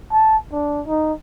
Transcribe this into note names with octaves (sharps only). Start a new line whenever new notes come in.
A5
D4
D#4